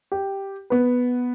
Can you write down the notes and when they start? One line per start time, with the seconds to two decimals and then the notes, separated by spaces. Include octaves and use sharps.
0.12 G4
0.70 B3 B4